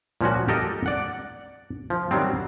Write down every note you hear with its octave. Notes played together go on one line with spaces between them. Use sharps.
A#2 F3 C#4 F#4
G4 A4 A#4 D#5
D5 F#5
F3
D#3 F#3 G3 C4